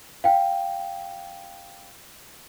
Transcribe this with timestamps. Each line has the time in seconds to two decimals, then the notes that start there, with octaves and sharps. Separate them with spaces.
0.24 F5 G5